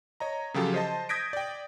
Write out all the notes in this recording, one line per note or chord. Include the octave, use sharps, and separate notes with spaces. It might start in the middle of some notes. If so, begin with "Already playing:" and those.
C#5 D#5 A#5
C#3 F3 F#3 F4 G4 A4
C5 D#5 A5
D#6 G6 G#6 A#6 B6 D7
D5 G5